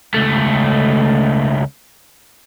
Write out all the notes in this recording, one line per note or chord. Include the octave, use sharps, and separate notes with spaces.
C#2 A3